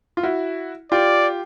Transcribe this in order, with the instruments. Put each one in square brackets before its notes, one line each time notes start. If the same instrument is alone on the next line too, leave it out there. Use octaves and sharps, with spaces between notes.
[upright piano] F4
E4 F#4
[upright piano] F4 G4 [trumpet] D5